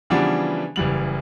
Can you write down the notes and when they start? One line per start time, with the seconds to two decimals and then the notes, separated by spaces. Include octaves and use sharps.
0.10 C#3 E3 F3 G3 B3 D4
0.76 F#1 E3 G3 F#7